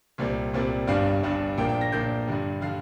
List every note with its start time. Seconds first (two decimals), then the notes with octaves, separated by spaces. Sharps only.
0.18 C2 A#2 G3 C4
0.53 C2 A#2 G3 C4
0.87 G1 G2 G3 D4 F5
1.23 G1 G2 G3 D4
1.58 A#1 A#2 A#3 D4 G5
1.69 G5
1.81 A#6
1.92 A#1 A#2 A#3 D4 G6
2.27 G2 D3 G3
2.61 D3 G3 F5